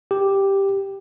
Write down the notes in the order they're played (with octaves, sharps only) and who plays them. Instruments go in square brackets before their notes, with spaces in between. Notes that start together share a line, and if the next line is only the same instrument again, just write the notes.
[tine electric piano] G4